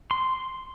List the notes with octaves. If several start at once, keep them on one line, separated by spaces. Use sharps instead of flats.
C6